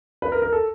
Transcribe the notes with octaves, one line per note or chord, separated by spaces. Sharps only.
B4
A#4
A#4
A4